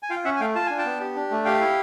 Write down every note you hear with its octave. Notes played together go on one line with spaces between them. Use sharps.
G#5
F4 F5 G5
C#4 E5 F#5
G#5
A3 F5 G5
F4 A5
D4 G#5
G5 A5
B3
G4
D4
A3
G4 F5 G5
E4